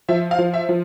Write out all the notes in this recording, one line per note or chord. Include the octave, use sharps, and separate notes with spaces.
F3 E5
F5
F3
E5
F3